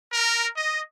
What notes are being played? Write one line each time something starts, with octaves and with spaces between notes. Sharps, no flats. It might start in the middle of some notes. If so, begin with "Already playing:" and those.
A#4
D#5